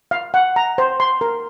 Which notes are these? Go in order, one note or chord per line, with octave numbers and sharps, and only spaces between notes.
F5
F#5
A#5
C5
C6
A#4